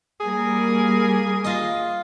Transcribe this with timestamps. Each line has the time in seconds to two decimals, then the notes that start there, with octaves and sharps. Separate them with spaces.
0.20 G3 A#3 G#4 A#4
1.44 F4 D#5